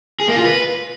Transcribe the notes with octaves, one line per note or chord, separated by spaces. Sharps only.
G#4
A#3
F4
B4